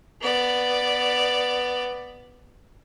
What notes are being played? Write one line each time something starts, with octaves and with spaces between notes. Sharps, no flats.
B3 D5